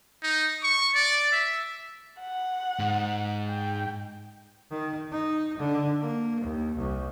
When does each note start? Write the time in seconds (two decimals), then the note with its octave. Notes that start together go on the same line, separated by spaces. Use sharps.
0.23 D#4
0.63 C#6
0.94 D5
1.32 E5
2.21 F#5
2.79 G#2
3.49 G5
4.70 D#3
5.12 D#4
5.59 D3
6.00 A#3
6.41 D#2
6.76 C2